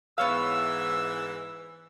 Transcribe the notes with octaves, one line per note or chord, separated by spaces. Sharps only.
G#2 E3 B3 C#5 F5 E6